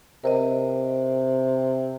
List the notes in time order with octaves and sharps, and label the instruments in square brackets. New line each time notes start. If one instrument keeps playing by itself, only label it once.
[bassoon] C3 [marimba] A#4 C5 D#5